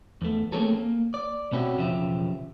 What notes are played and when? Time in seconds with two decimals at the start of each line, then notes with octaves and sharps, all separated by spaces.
0.22 E2 A3
0.52 A3 A#3 C4 C#4 G#4 A4
0.73 A#3
1.14 D5
1.52 B2 C4 C#4 E4 F#4 G4
1.77 B1 E2 C#3 F3 G4 E5